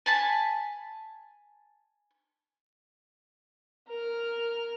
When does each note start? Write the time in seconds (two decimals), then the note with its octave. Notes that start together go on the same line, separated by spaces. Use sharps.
0.06 G#5 A5 B5
3.88 A#4 F6